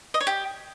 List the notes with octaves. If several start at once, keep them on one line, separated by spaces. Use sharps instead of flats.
D#5
C#5
G4